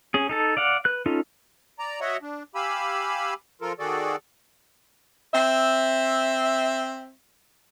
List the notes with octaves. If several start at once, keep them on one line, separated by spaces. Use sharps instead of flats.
C#4 G#4
D#4 A4 A5
D5 F5 F#5
B4 F#6
C#4 D#4 F4 A4
D5 A#5
F#4 C#5 D#5 E5 F#5
D4
G4 F5 G#5 B5 E6
F3 F4 A4 A#4
D#3 F#4 G#4 A4 D5
C4 E5